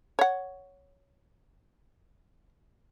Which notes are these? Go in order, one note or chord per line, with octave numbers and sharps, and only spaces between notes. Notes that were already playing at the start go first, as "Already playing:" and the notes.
C#5 F#5